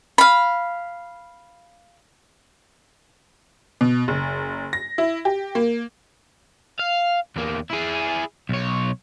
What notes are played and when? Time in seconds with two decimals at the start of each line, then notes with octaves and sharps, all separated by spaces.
0.18 F5 B5
3.81 B2
4.08 F#1
4.73 A#6
4.98 E4
5.25 G4
5.55 A#3
6.79 F5
7.36 E2 A#3
7.71 E4 G#4
8.49 B1 C#5